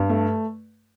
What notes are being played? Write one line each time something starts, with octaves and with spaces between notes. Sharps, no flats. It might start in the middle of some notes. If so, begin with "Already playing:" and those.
Already playing: G2
A3